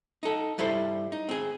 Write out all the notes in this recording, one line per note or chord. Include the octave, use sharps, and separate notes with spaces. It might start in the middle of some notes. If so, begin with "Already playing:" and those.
D#4 A4
G2 G3 E4 A4 C5
D#4
C4 G#4